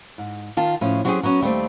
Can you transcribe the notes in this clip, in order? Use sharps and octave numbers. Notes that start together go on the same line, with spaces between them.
G#2
D#3 F4 A5
A2 F3 C#4
F#3 G3 C4 C#4 G4 G#4
F#3 B3 C#4 F#4
D#2 G3 A3 C4